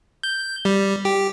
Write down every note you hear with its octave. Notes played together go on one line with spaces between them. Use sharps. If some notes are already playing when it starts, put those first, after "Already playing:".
G6
G3
G4